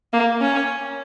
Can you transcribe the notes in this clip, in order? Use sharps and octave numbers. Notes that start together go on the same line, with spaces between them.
A#3
C#4